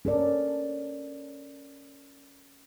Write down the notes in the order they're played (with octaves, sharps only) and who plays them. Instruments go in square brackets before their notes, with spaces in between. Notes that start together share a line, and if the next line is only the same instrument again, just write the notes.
[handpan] C#4 A4 A#4 D5